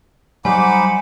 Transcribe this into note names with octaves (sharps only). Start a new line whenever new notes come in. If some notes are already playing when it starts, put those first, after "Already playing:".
F#3 G3 D#4 C5 F#5 G#5 B5 D6